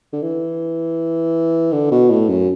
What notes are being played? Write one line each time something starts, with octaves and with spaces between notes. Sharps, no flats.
D3
E3
D3
B2
A2
F#2